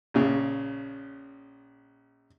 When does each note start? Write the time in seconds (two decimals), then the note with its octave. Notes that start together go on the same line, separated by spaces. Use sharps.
0.14 A#1 C#3